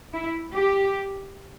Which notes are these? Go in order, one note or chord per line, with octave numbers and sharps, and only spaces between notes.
E4
G4